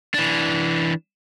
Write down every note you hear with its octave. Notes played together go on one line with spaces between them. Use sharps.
E3 D4